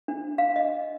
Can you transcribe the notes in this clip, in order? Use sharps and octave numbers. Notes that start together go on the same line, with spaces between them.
D4
F5
D#5